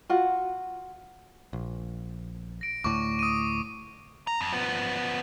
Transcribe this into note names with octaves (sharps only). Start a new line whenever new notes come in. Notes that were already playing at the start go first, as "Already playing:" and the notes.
F4 F#4 F#5
A#1
A#6 D7
D2 A2 C#6 D6
D#6 D#7
A#5
F2
F3 B3